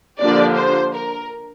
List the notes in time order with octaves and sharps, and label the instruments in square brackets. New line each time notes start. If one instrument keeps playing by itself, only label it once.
[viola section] D3 F3 A#3 D4 G4 [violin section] D5
[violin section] C5
A#4